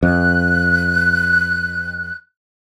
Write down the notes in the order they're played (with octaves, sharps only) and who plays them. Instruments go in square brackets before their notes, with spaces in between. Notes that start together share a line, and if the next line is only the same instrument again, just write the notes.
[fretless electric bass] F2 [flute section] F#6